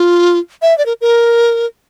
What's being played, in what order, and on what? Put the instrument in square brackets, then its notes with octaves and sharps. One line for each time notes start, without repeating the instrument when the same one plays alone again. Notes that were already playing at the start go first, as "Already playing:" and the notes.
Already playing: [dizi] F4
E5
D5
A#4
A#4